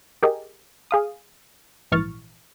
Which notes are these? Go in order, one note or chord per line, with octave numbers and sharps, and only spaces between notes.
G4 G#4 A#4 D#5
G#4 F5 D#6
A#1 G#2 E3 C#6 F6 A6